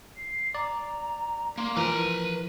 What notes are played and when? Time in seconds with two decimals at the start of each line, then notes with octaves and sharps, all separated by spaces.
0.17 C7
0.55 D5 A#5
1.57 A#3 C6
1.77 E3 F3 A#4 B4 A#5 D#7